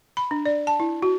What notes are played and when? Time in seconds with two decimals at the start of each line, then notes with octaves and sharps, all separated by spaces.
0.17 B5
0.31 D4
0.45 D5
0.67 A5
0.80 E4
1.02 F#4